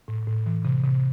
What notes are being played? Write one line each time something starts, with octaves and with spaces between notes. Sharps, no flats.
A2
A2
E3
C3
C3